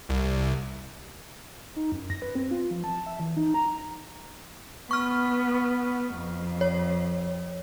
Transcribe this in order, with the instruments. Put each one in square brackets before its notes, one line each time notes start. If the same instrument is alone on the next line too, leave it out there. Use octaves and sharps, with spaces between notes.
[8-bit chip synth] C2
[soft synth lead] D#4
F#2
A#6
B4
C4
F4
F3
A5
E5
E3
D#4
A#5
[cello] B3 [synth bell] C#6 F6
[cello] F2
[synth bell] C#5